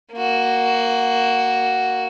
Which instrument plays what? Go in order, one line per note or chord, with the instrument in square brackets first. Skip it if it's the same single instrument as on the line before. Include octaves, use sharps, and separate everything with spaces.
[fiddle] A#3 F#4